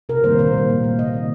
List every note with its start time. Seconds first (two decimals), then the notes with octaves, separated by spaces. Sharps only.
0.09 C3 A#4
0.24 D#3 G3 A#3 C5
0.39 A#2 C5
0.54 G3 A#3
0.69 A#2
0.84 A#3
0.99 C3 D#5
1.14 D#3 A#3